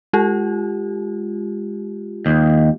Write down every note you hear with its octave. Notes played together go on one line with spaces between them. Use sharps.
G#3 F4 G4
D#2